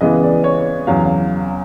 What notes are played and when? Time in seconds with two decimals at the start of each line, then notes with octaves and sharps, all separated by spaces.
0.01 C#3 E3 G#3 B3 D#5
0.23 D5
0.44 C#5
0.87 E2 C#3 F#3 F5